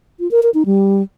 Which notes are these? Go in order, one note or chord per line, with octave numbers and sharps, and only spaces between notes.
F4
A#4
A#4
D#4
G3